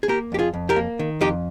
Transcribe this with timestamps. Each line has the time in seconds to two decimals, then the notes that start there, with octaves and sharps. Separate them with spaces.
0.03 G#4
0.08 A#3 G4 A#4
0.32 F2 G4
0.39 F4 G#4
0.54 F2
0.69 G4 A#4
0.76 A#3
0.99 D#3
1.21 F2 D#4 G4